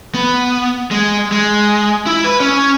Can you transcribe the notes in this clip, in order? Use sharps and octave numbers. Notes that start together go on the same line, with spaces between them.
B3
G#3
G#3
E4
B4
C#4